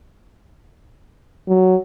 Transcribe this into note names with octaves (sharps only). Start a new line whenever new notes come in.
F#3